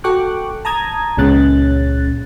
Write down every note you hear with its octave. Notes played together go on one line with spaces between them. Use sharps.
F#4 A4 G5 C#6 D6 F#6
A5 A#5 D#6 G#6
C#2 A#2 G#3 C#4 F#6 A6